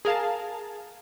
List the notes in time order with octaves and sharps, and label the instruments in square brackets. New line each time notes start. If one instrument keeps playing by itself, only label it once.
[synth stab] G#4 A#4 F5 A5